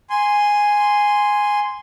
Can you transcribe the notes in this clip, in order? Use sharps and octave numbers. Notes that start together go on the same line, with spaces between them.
G#5 C6